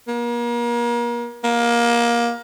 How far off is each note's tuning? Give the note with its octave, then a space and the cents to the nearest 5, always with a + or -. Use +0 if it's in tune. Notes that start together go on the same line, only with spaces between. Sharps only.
A#3 +35
A#3 +20